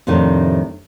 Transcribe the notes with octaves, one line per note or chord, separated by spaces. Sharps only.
F2 A2 C3 D#3 A3 D4